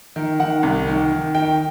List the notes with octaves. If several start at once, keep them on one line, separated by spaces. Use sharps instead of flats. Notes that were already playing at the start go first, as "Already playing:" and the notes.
D#3
D#3 F#5
C2
D#3
D#3
D#3 G5